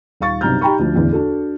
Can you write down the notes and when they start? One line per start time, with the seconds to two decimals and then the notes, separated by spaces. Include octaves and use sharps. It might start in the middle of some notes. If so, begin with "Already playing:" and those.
0.20 D#1 F5 C#6 A6
0.41 B1 G2 C3 A#5 F6 G6
0.61 D#4 G4 G5 A#5 B5 C#6
0.79 D2 F3 D4
0.94 A1 E2 D3
1.13 D4 F#4 A4